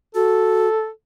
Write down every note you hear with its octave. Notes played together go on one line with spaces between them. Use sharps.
F#4 A4